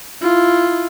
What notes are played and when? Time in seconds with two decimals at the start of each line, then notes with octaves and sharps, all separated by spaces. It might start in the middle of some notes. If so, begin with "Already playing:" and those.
0.22 E4 F4